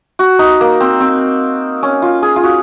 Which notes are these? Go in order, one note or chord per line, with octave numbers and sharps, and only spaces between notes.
F#4
D#4
A#3
C4
C4
C#4
F4
G#4
F4
F#4